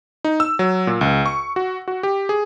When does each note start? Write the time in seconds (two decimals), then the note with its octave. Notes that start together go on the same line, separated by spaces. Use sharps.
0.24 D#4
0.40 E6
0.59 F#3
0.87 A#2
1.01 C#2
1.26 C#6
1.56 F#4
1.88 F#4
2.03 G4
2.29 G#4